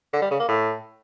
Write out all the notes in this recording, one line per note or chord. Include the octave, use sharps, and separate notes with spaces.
D3
G3
C#3
A#3
A2